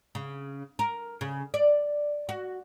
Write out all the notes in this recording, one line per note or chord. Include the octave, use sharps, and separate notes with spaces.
C#3
A#4
C#3
D5
F#4